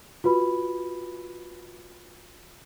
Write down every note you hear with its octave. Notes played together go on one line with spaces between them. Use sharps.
F4 F#4 B4 B5